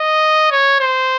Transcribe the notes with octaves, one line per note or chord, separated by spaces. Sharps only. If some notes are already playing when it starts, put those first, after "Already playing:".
Already playing: D#5
C#5
C5